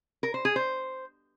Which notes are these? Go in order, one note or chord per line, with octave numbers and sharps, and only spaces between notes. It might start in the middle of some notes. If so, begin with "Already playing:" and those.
A#4
C5
G#4
C5